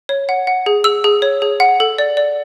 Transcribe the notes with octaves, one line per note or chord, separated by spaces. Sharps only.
C#5
F#5
F#5
G#4
G#4 E6
G#4
C#5
G#4
F#5
A4
D5
D5